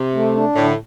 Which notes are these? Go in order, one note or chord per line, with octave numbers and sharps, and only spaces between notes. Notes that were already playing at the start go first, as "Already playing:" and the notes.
Already playing: C3
A3
D4
A2 D3